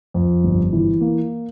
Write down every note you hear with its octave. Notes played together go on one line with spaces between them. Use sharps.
F2
G1
E3
A#3